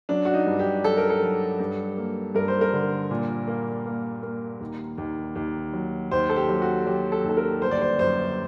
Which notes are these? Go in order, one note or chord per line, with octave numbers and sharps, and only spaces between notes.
F#3 D4
F#4
D#4
G2
G4
F#3 A4
A#4
A4
F#3
G2
A#3
G2 A#4
C5
A#4
D3
A#2
A#3
A#3
A#3
D#2
D#2
D#2
F#3
D#2 C5
A4
G4
F#3
F#4
F#3 G4
A4
D#2 A4
A#4
G1 C5
D5
C5
F#2 C5